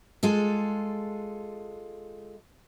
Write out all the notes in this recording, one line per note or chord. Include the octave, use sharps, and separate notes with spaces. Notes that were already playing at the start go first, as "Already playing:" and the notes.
G#3 F4 A4